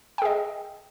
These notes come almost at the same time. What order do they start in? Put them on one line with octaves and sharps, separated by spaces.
G5 G#4 D#5